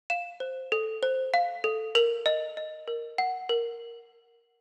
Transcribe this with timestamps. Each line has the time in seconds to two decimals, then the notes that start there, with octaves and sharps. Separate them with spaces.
0.10 F5 E7
0.40 C5
0.72 A4
1.03 C5
1.34 F5
1.64 A4
1.95 A#4 F7
2.26 D#5
2.57 D#5
2.88 A#4
3.18 F#5
3.49 A#4